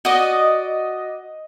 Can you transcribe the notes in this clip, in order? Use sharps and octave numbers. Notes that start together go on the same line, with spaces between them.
F#4 D5 D#5